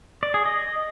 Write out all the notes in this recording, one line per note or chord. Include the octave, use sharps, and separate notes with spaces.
D5
G#4
D#5